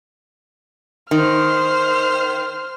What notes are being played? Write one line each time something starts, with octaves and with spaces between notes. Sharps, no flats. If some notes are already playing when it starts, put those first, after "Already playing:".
D#3 C5 F6